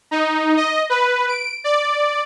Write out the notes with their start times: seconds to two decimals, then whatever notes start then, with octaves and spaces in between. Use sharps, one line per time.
0.11 D#4
0.57 D#5
0.90 B4
1.29 D7
1.64 D5